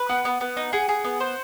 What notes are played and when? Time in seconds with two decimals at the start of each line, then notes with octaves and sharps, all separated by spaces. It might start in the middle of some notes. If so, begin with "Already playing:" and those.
Already playing: B4
0.09 B3 F#5
0.25 B3
0.41 B3
0.57 D#4
0.73 G#4 F#5
0.89 G#4
1.04 B3
1.20 C5